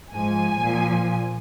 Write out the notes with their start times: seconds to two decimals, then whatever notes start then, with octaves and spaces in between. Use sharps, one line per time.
0.13 G#2 F3 G#5
0.63 A#2 F3